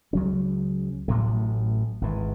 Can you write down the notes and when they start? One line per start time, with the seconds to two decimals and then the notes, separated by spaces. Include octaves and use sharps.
0.13 C#2 C#3 F#3 C#4
1.08 A1 A2 F#3 A3
2.01 G#1 G#2 E3